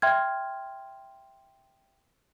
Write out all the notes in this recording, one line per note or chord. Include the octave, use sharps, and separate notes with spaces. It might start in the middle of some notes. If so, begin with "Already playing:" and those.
E5 G5 C6 F6 G#6